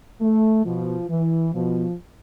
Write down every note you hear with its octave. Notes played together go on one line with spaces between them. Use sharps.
A3
B2 F3
E3
B2 F3